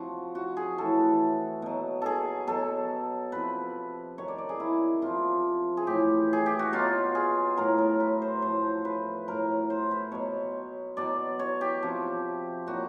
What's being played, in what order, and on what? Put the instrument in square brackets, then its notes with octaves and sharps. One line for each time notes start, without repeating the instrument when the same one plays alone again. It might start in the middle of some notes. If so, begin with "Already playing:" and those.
Already playing: [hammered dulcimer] C3 F3 F#4
F#4
G#4
A2 E3 A4
B2 F#3
G#4 A4
B2 F#3 A4
C3 F3 B4
C3 D#3 F#3 C#5
D5
D5
G#4
E4
C3 F3 F4
G#4
A2 E3 G4
G#4
G4
F#4
B2 F#3 F4
G#4
A2 F#3 A#4
A#4
B4
C5
A2 F3 C5
B4
A2 F#3 A#4
C5
B4
B2 F#3 C#5
B2 F#3 D5
C#5
G4
C3 F3
A#2 F#3 F#4